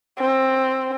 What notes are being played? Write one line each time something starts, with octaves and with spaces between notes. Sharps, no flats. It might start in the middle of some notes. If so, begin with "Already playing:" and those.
C4